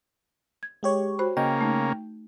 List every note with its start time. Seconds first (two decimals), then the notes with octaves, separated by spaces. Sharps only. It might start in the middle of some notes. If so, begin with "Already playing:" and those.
0.63 G#6
0.83 G#3 G4 C#5
1.19 F#4 C5 B5
1.37 C#3 A#3 D#5 G5
1.61 A3 D#4